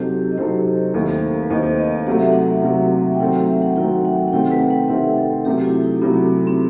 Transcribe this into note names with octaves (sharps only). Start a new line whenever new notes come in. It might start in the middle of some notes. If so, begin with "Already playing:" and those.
Already playing: C3 F#3 C4 D#4 G4 A4
D#5
C3 F#3 C4 D#4 A4 C5
D#2 D#3 A3 D#4
B4
D#2 D#3 A3 D#4 C5
D#5
C3 F#3 A3 F#5
E5
F#5
C3 F#3 A3
G5
D#3 F#3 A3 C4 F#5
F#5
E5
F#5
D#3 F#3 A3 C4 G5
F#5
F#5
C3 D#3 A3 C4 G5
B4
F#5
C3 D#3 A3 C4 E5
A4
C3 F#3 A3 G4
E4
D#4
C3 F#3 A3 B3
C4